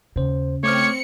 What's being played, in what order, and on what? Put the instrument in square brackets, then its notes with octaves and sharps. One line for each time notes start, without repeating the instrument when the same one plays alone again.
[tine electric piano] D#2 C5 [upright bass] C#3
[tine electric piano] A3 D6 F6 [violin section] C4 C#7 [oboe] C#5